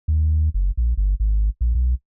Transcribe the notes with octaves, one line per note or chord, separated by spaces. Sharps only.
D#2
F#1
A#1
G1
G#1
A#1
B1